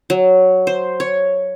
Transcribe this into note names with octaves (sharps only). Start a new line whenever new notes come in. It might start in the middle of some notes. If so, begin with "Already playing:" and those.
F#3
C5
C#5